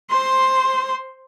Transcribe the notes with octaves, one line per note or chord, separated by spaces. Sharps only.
C5 C6